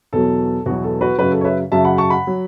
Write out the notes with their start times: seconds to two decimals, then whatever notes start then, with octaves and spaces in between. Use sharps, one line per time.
0.13 E2 B2 F#3 A4
0.66 E2 B2 F#3 F#4
0.84 A4
1.01 F#4 B4
1.18 F#2 C#3 F#3 F#4 B4
1.32 A4
1.41 C#5
1.45 B4 E5
1.71 F#2 C#3 F#3 E5 A5
1.85 F#5 B5
1.98 A5 C#6
2.10 F#5 B5
2.27 F#3